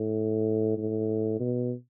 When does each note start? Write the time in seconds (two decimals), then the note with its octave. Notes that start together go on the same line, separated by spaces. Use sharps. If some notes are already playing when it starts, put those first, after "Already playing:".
Already playing: A2
0.78 A2
1.40 B2